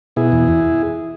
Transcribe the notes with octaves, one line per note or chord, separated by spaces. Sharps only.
B2 E4 G#4
E2
E2